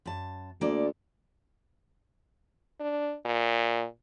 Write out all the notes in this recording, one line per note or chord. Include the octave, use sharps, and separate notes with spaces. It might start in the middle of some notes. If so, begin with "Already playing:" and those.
F#2 A5
D2 A#3 D5
D4
A#2